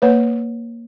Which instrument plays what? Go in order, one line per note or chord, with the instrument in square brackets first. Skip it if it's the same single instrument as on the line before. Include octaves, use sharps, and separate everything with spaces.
[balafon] A#3 B4 C#5